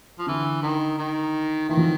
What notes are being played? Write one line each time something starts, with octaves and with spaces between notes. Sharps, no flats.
F3
D3 E3
D#3
D#3
D#3 E3
F3